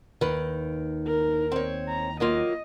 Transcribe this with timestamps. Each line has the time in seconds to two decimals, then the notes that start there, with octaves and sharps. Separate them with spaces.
0.21 D#2 D#3 B4
1.07 A#4
1.52 C4 C#5
1.88 A#5
2.20 F#3 A#3 F4 D#5